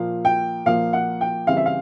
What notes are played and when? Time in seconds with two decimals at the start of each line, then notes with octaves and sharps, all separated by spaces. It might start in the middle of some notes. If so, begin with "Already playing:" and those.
Already playing: A#2 F3 A#3 F5
0.25 G5
0.66 A#2 F3 A#3 F5
0.93 F#5
1.21 G5
1.47 C#3 E3 G3 C4 F5
1.57 E5
1.66 F5